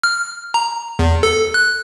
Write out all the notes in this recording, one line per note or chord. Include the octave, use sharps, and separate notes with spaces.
F6
A#5
E2
A4
F#6